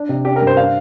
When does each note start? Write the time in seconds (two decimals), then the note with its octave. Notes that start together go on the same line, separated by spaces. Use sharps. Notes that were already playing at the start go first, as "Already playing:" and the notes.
Already playing: D4
0.09 C3
0.25 D4 G4
0.36 A#4
0.42 G2
0.47 C5
0.57 D4 F5